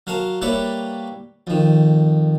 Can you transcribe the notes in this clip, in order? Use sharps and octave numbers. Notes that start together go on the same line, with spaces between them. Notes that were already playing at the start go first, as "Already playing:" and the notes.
F#3 A#4 F5 A5
G3 A#3 E4 B4 C#5 D5
F2 D#3